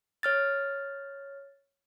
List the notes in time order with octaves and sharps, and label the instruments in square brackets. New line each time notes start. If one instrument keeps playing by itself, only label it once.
[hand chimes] C#5 F6 A6